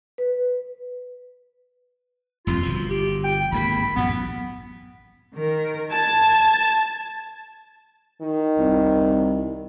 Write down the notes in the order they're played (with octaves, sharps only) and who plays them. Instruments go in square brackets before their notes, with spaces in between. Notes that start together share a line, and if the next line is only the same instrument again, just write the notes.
[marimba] B4
[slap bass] D#1 F2 C3 [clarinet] F4
[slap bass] G1 B2 F3
[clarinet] G4
G5
[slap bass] G#1 G#2 A#3 [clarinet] B5
[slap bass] A1 F#2 A2 [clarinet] B3
[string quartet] D#3 A#4
[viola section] A5 [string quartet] G#6
[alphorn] D#3
[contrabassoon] C2